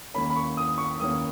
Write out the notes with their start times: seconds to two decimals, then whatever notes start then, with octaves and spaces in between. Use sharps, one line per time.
0.14 D#2 D#3 A#3 C#4 B5
0.30 B5
0.36 C#6
0.57 D#6
0.78 C#6
1.00 D#2 D#3 A#3 C#4 D#6